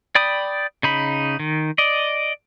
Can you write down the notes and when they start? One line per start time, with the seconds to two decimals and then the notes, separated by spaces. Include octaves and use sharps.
0.15 D5 G5 B5 D#6
0.83 C#3 D#4 B5
1.39 D#3
1.78 D5 D#5